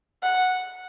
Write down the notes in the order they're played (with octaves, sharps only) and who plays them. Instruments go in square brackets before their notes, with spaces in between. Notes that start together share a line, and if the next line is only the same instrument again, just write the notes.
[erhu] F#5